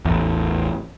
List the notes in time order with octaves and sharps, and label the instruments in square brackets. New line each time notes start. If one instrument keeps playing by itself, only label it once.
[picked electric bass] A1 E2